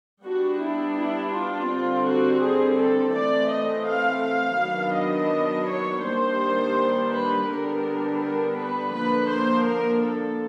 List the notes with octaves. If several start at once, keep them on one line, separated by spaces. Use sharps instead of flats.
G3 B3 D4 F#4
E4
E4
F4
D3 G3 C4
F#4
G#4
A4
E3 A3 C4 D5
D#5
F5
F5
D#3 F#3 B3 D4
D#5
C#5
D#3 G3 A#3 D4 C5
B4
D3 G3 B3 D4 A#4
A#4
B4
D3 F3 A#3 D4 B4
C5
A#4
A4